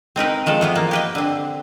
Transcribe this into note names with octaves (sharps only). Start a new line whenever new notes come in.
C4 D#4 A#4 B4
D#3 F3 G#3 A4
E3 F3 B3
A#3
G4 B4 D#5
D3 C4